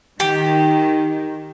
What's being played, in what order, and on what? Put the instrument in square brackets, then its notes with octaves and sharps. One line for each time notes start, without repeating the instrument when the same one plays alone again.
[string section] D#3 [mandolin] G4